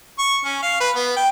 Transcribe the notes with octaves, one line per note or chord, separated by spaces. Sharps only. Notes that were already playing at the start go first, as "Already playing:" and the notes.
C#6
C#4
F5
B4
B3
G5